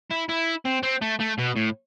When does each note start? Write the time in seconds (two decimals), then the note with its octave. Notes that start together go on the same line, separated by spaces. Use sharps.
0.11 E4
0.29 E4
0.65 C4
0.83 C4
1.01 A3
1.20 A3
1.38 B2
1.56 A2